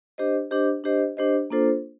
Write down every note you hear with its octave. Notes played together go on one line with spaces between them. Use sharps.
D4 G4 C5 D#5
D4 G4 C5 D#5
D4 G4 C5 D#5
D4 G4 C5 D#5
A#3 D4 F4 A4 C5